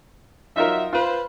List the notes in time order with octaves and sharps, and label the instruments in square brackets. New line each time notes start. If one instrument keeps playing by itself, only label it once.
[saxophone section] F#3 E5 [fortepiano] D#4 F4 A#4
[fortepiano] F4 [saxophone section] B4 C5